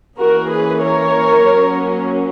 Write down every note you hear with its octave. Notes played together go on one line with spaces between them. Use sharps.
E3 A#3 C#4 F#4 A#4
G#4 B4
A#4 C#5
F#3 A#3 C#4